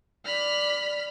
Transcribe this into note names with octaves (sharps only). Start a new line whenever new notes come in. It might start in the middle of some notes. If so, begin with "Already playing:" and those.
D5 B5 F6